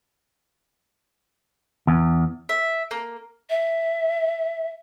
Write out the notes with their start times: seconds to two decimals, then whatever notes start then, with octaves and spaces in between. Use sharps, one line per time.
1.87 E2
2.49 E5
2.91 A#3
3.50 E5